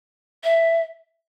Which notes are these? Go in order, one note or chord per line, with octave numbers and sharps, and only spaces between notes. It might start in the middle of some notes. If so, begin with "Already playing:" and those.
E5